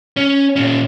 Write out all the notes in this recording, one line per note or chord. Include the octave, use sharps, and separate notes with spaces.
C#4
A#2 C#4